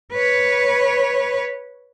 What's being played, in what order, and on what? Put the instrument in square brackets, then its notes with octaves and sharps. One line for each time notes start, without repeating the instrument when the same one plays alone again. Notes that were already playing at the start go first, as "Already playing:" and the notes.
[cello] B4 C#5